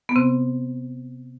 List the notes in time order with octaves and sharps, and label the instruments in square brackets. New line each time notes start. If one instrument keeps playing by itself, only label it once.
[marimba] B3
C3 C4